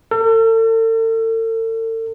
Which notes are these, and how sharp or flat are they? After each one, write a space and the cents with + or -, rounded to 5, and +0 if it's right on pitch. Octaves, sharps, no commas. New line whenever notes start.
A4 +40